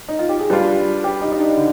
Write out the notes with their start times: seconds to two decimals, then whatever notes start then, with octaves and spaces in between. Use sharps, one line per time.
0.08 D#4
0.19 F4
0.29 G4
0.39 G#4
0.50 G3 D4 F4 B4
1.04 G4
1.22 D#4
1.32 D#4
1.39 D4
1.57 D3